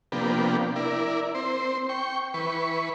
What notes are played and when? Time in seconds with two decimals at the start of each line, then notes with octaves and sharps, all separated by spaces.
0.12 C3 F3 A#3 B3 D4 G4
0.76 E4 A#4 D5
1.35 C4 C5
1.89 G5 C#6
2.34 E3 B4 C#6